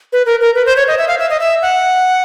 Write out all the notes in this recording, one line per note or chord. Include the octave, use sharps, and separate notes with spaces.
B4
A#4
A#4
B4
C5
C#5
D#5
E5
F5
E5
D#5
E5
F#5